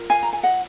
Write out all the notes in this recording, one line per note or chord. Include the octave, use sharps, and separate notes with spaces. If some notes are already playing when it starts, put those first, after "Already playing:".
Already playing: F4 A#4
F5 G#5
A#5
G#5
D#5 F#5